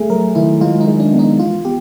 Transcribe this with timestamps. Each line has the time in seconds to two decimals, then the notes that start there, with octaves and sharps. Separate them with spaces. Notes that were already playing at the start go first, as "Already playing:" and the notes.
Already playing: A3 G#4
0.10 F#3 A#4
0.35 D#3 E4
0.61 G#3 F4
0.81 D#4
0.87 G#3
1.00 D4
1.13 B3
1.19 D#4
1.39 E3 F4
1.65 B3 G4